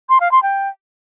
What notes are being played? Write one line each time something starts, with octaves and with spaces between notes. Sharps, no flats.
C6
F5
C6
G5